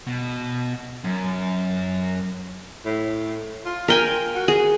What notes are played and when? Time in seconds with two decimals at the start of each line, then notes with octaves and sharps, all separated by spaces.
0.07 B2
1.04 F#2
2.85 A2
3.66 F4
3.88 A#4 G5 G#5
4.35 F#4
4.48 G#4